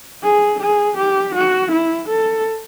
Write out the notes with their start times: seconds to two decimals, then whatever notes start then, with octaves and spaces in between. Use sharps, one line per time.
0.23 G#4
0.60 G#4
0.98 G4
1.35 F#4
1.72 E4
2.09 A4